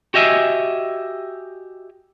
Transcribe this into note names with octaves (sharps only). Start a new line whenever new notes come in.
F#4 G4 D#5 E5 G#5